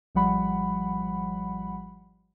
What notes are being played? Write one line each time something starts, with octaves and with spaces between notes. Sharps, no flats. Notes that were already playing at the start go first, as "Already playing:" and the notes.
G#1 F3 G3 F#5 B5